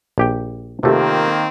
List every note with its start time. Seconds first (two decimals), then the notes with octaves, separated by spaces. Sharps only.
0.18 A#1 G4 G5
0.83 C3 D#3 A3 A#3 C4 F4 G4 A4